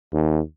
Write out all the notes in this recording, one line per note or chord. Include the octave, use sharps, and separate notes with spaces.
D#2